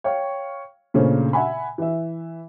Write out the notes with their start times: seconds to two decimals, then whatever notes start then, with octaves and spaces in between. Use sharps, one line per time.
0.04 C#5 F5 G5 C#6
0.94 A#2 C#3 A3 C#4 D4 C5
1.33 E5 F#5 G#5 B5
1.78 E3 E5